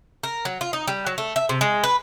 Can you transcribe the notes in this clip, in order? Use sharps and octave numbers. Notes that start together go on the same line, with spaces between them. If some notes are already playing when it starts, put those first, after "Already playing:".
A#4
F#3
F4
D#4
G3
F#3
A3
E5
C3
G#3
B4